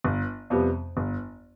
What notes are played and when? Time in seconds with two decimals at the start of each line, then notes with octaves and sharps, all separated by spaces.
0.04 G1
0.50 F2 C3 G3 B3
0.97 G1